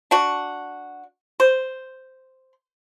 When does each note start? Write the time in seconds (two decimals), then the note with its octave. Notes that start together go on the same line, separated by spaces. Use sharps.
0.11 D4 F#4
1.40 C5